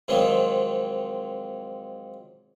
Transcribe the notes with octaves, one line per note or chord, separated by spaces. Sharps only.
G#2 D#3 F3 F#3 C4 F4